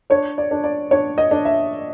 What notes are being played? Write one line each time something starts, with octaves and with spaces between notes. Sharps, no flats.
D4 C#5
D5
D4
D5
D4 C#5
D#5
D4
E5